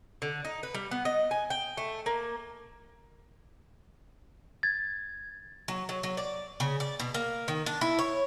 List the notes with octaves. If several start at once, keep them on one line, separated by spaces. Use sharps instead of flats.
D3
D#4
B4
G3
B3
D#5
G#5
G5
A3
A#3
G#6 A6
F#3
F#3
F#3
D5
C#3
D5
B2
A#3
D#3
D4
E4
C#5